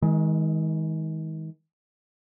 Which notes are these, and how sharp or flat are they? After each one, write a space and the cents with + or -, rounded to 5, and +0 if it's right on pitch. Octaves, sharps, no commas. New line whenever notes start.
D#3 +40 G#3 +0